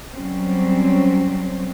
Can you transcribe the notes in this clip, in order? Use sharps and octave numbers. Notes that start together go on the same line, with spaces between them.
F#3 G3 C4 C#4